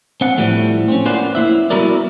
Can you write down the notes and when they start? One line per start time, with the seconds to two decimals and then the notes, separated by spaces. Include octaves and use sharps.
0.21 C4 F#5
0.37 A2 F3 G3 A3
0.88 C4 C#4
1.06 A#3 F4 B4 C5 D5 F#5
1.35 A#3 E4 E5
1.70 G3 B3 E4 F#4 A#4 D5